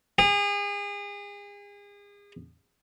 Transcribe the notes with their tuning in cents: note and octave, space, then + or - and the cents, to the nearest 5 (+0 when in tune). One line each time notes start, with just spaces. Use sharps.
G#4 -35